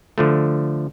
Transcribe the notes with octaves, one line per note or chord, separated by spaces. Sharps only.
D3 F3 A3